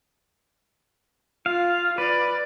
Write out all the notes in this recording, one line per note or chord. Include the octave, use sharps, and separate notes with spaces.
F4 F5
B4 D5